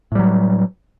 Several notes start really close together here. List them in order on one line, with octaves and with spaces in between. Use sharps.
A2 G3 F#3